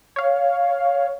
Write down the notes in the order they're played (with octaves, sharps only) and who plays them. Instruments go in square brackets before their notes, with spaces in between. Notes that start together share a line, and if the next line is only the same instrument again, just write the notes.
[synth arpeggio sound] C#5 F5